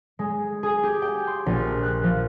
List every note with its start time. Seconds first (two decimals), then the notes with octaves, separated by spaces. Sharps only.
0.19 G#3
0.63 G#4
0.83 G4
1.02 G5
1.27 C6
1.46 A#1
1.83 F#6
2.04 F3